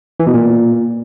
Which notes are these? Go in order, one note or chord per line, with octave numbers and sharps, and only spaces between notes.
E3
B2
A#2